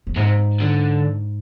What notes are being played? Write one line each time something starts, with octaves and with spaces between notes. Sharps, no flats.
F2
G#2 C3
D3